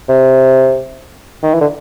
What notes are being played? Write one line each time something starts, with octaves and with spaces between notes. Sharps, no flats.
C3
D#3
E3
D3